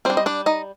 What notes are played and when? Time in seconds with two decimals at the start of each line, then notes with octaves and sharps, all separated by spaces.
0.05 G3 C4 D4 C5
0.17 D#5
0.26 D4 D5
0.46 D#4 D#5